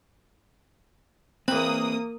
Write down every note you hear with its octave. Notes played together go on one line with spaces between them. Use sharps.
E2 A#3 C4 B4 D#6